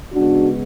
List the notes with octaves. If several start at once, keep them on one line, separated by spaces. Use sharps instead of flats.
C#3 G#3 B3 D4 F#4